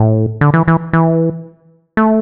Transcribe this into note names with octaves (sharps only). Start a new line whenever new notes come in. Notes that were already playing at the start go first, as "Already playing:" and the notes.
Already playing: A2
D3
E3
E3
E3
A3